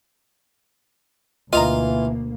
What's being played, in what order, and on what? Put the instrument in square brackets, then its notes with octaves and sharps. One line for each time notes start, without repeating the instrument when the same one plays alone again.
[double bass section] D2 B2 A#3 [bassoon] E3 [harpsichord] F4 [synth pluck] D#5 F5 A#5